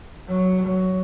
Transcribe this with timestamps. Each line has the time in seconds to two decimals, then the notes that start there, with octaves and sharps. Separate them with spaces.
0.28 F#3
0.66 F#3